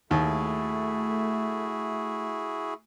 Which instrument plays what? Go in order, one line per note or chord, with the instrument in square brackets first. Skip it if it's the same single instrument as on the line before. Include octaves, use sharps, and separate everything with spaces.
[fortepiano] D#2 [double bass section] A3 [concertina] E4 F#4 G#4